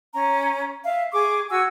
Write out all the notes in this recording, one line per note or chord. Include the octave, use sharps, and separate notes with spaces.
C#4 A#5
E5 F5
G#4 C#6 D6
F#4 F#5 G#5 E6